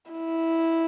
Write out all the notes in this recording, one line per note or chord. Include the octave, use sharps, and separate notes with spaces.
E4